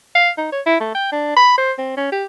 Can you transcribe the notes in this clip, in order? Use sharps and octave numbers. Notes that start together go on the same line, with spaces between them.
F5
D#4
C#5
E4
A3
G5
D4
B5
C5
C4
C#4
G4